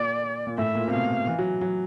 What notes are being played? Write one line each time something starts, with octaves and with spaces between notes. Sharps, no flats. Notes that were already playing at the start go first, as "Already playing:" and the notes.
Already playing: A#2 D5
A#2
A2 E5
A#2
C3
B2 F5
E3
F#3
F#3